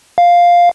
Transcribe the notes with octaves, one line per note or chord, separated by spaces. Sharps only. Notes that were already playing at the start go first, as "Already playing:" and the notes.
F5